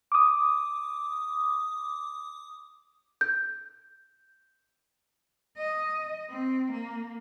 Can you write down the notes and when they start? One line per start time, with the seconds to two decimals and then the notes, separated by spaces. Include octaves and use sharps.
0.12 D6 D#6
3.21 G6
5.57 D#5
6.30 C4
6.72 A#3